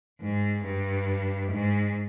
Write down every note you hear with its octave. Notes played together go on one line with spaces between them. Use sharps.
G#2
G2
G#2